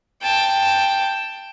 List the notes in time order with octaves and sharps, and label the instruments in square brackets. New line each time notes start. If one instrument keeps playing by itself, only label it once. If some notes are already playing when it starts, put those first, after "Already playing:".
[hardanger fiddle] G5 A5